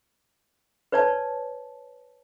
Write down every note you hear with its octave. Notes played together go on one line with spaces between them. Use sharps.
B4 C#5 D5 G#5 A5